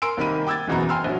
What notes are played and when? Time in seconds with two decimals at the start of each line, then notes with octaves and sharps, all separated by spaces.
0.02 A#4 G#5 C6 E6 D7
0.17 C2 D#3 A#3 B5 D#7
0.46 G5 D6 E6 G#6 A6
0.68 F#1 E2 B2 E3 B3 A#5
0.89 G5 G#5 C6 E6 F6
1.04 A#1 F#3